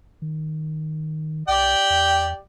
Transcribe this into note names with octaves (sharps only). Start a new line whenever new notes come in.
D#3
B1 G4 D5 G5
E2